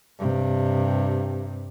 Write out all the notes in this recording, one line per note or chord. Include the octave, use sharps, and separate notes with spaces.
G2 C3